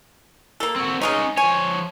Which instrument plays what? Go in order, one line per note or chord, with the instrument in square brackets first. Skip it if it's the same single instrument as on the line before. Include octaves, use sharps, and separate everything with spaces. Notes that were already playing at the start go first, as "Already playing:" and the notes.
[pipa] A#3 A4
[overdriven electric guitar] C4 F#4
[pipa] C#3 G#3 D#4 [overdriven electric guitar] C#4 D#5
[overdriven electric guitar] F3 C#5 [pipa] G#5